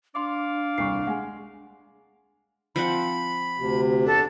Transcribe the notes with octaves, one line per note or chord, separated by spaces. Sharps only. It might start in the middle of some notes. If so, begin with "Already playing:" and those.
D4 D5 F5 C6 D6
D#1 C2 C#6 C7
G#3 F#5 G#5
F3 C4 F#5 B5
D2 C3
E2 D4 A4